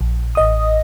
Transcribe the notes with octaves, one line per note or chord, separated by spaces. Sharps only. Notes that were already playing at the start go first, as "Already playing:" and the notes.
A#1
A1 D#5 D#6